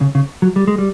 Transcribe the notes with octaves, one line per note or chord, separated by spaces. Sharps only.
C#3
C#3
F#3
G3
G#3
G3